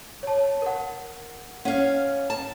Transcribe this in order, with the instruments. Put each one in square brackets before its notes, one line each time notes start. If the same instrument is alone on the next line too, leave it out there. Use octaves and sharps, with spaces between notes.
[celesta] C#5 A5
A#4 F#5
[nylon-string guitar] C#4 F5 [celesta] F#5
[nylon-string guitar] A5